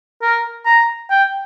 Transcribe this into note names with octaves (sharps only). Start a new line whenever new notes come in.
A#4
A#5
G5